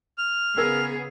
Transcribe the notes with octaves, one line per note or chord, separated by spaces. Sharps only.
F6
C#3 B3 G#4 A#4 E6 G#6